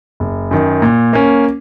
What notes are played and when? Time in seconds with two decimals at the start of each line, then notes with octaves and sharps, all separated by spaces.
0.20 F#1
0.51 F#2 D#3
0.82 A#2
1.13 A#3 C#4